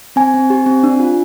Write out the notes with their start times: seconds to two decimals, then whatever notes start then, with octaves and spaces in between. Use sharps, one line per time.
0.16 C4 G#5
0.34 C4
0.50 G4
0.66 C4
0.83 D4
1.00 F4